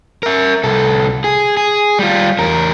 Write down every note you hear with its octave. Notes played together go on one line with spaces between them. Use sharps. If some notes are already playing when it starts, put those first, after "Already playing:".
A#4 E5
C2 A4
G#4
G#4
G3 F4
E2 A#4